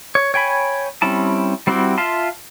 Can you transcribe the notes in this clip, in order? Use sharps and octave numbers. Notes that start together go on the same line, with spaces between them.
C#5
C#5 G5 G#5 B5
G3 C4 C#4 E4 A5
G3 C4 E4 F#4 G4
F4 E5 F5 A5 C6